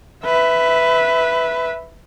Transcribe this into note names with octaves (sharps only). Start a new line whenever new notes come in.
B4 E5